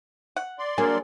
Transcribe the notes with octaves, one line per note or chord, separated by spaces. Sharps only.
F#5
D5 C6
F#3 A#3 D4 G#4 A#4